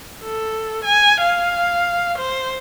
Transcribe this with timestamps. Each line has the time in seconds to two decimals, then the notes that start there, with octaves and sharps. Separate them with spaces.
0.22 A4
0.85 G#5
1.21 F5
2.18 C5